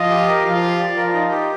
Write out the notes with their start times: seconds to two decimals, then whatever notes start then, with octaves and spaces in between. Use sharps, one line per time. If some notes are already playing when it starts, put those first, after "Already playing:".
Already playing: F3 F4 D#5
0.10 G4
0.28 A#4
0.45 F3 F4 F5
0.62 G4
0.80 D5
0.96 F3 F4 A#4
1.14 D#4
1.31 G4